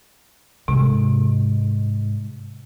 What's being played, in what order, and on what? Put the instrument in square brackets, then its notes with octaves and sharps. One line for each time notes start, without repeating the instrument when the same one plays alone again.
[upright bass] G#2 [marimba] C3